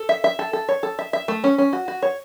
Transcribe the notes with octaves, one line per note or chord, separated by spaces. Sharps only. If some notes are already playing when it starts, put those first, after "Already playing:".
Already playing: A4
E5
E5
A4
A4
C#5
A4
E5
E5
A3
C#4
C#4
F#4
F#4
C#5